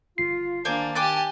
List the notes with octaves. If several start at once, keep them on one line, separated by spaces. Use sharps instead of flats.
G1 F4 C7
D#3 A#3 D4 C5 D5 G#5 A5
G4 G5 G#5 D6 F#6 A6